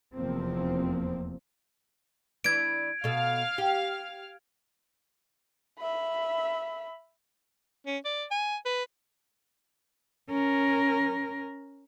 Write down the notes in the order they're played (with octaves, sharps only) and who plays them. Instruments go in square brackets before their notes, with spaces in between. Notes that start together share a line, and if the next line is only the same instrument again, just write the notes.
[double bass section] F1 E2 F3 A#3 C4
[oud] E3 D4 [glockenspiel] G#6 D7
[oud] B2 A4 [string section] F5 F6
[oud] G4
[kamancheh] E5 B5
[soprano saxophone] C#4
D5
G#5
B4
[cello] C#4 A#4